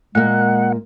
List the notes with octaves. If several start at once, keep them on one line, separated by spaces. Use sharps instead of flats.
A#2 G#3 A#3 F#5